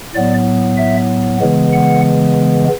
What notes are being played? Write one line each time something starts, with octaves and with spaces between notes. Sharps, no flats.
A2 F#3 B3 D5
E5
C#3 E3 G#3 B3
F#5